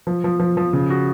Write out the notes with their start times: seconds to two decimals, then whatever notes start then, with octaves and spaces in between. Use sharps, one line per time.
0.07 F3
0.24 F3
0.40 F3
0.57 F3
0.73 C#3
0.90 F#4